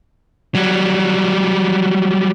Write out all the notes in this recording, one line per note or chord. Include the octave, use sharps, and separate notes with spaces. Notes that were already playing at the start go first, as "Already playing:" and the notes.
F#3 G3